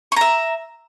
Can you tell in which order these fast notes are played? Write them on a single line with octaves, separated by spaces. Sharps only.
C#6 A#5 E5